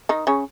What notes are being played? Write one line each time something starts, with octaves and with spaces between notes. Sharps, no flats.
D#3 D#4
C#3 C#4